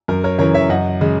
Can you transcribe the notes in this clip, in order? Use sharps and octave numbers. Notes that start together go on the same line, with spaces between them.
F#2 A#4
A#4 C#5
C#3 E3 A#4 C#5
C#5 E5
F#2 D#5 F#5
C#3 G#3